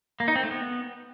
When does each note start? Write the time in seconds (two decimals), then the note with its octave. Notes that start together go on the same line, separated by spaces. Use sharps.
0.20 A#3
0.28 D#4
0.36 C4
0.43 A3
0.51 B3